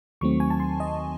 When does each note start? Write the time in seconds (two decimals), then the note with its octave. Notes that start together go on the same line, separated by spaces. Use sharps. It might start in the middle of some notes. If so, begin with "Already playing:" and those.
0.21 D#2 D#3 F#3 A3 C4 C#6
0.40 G#5
0.50 A5
0.60 C6
0.80 D#5